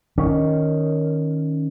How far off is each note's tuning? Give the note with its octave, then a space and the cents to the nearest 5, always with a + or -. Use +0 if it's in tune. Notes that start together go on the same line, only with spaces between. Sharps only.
D#3 +0 C#4 +0